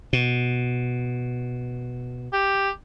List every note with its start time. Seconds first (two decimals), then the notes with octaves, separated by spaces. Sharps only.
0.13 B2
2.33 G4